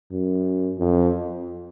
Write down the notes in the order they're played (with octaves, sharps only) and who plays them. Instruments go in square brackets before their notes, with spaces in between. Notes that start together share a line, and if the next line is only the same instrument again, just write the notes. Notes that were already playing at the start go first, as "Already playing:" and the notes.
[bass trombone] F#2
F2